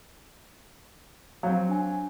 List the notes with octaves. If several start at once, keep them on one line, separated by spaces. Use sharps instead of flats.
F#3 C4 F5
D4 G#5